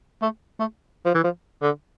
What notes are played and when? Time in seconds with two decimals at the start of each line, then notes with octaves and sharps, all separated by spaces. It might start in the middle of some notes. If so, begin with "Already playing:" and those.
0.22 A3
0.59 A3
1.06 F3
1.14 E3
1.24 F3
1.62 D3